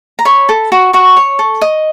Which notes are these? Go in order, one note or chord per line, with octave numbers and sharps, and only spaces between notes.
A#5
C#5 B5
A4
F#4
F#4 C#6
C#5
A4
D#5